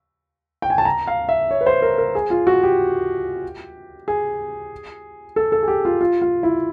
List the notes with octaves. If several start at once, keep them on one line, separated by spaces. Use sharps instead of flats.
G5
G#5
A5
A#5
F5
E5
C#5
B4
C5
A#4
A#4
G#4
F4
F#4
G4
G#4
A4
A4
G#4
G4
F4
F4
F4
E4